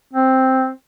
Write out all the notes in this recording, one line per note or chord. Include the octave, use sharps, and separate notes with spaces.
C4